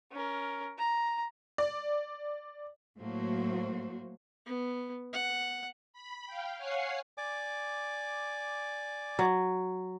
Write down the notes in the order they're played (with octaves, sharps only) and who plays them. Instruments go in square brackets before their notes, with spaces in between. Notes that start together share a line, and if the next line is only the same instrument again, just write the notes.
[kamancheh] C#4 A#4
A#5
[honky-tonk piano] D5
[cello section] A2 F#3 A3 A#3 F#4 C5
[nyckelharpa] B3
F#5
[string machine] B5
F5 G5
C#5 F5 F#5 G#5 C7
[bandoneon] D5 G#5 D6
[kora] F#3